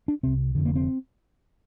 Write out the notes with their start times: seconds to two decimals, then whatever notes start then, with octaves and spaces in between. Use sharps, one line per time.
0.08 D4
0.23 C2 C3 C4
0.55 F1 F2 D3
0.65 A#3
0.75 C4